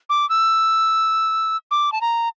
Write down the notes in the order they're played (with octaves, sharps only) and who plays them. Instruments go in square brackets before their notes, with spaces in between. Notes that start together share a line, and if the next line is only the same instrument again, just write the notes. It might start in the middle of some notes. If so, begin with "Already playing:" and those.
[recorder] D6
E6
D6
A5
A#5